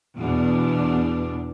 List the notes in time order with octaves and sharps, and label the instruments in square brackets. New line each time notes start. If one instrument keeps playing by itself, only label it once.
[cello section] E2 B2 D4